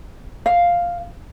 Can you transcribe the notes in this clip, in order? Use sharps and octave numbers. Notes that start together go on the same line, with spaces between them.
F5